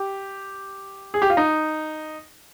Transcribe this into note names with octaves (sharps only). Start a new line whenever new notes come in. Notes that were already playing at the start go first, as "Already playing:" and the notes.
Already playing: G4
G#4
G4
F4
D#4